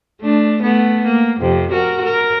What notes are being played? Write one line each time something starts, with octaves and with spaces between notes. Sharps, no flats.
A3 D4
A3 B3
A#3
F2 C3
F#4 A#4
A#4